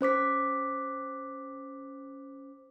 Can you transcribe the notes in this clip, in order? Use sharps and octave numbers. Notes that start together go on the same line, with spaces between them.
C#4 C5 D6 B6